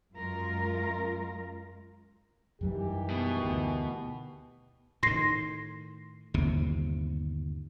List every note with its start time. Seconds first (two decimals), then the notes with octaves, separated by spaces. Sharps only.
0.15 F#2 G#3 F4 A#4
2.61 F#2 D#3 E3 F#3 G3 G4
3.10 B2
3.44 D2
5.03 A2 D#3 C6 A#6 C7
6.34 G1 D#2 C3